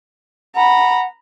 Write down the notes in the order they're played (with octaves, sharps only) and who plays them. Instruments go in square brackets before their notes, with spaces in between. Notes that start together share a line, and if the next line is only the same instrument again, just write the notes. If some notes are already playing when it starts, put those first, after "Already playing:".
[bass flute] F#5 [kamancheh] A#5 B5